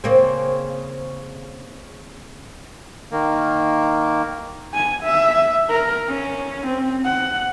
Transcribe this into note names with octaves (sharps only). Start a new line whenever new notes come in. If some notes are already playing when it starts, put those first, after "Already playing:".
C#3 A#3 C4
D#3 A#3
G#5
E5
A#4
C#4
C4
F#5